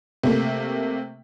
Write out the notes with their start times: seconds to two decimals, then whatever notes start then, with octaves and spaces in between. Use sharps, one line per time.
0.23 C3 A3 A#3